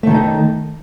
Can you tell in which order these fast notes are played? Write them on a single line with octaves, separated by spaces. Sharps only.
A3 D#3 A4 D#4